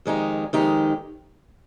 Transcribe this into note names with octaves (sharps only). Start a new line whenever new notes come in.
F2 D#3 G#3 D#4 G4
F2 D#3 G#3 D#4 G4